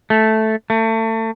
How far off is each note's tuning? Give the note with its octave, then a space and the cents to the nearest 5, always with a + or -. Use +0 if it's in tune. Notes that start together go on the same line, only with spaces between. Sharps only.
A3 -5
A3 +30